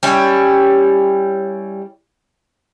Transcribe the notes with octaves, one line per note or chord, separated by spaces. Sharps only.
G3 C#4 E4